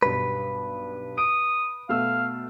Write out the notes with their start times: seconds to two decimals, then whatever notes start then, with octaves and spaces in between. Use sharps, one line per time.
0.02 B1 G2 B4
1.18 D#6 D7
1.89 B2 A3 F5 E6